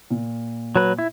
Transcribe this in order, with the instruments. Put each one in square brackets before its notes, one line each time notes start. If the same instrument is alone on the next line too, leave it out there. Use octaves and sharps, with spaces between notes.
[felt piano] A#2
[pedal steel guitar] F#3 B4
E4